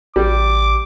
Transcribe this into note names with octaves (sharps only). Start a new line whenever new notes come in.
A1 G3 D6